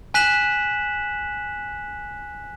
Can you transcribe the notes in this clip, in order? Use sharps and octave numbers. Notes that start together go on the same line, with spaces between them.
G#5 F#6 B6 E7 F#7